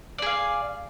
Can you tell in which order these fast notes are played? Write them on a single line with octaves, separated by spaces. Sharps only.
D5 G#4 F5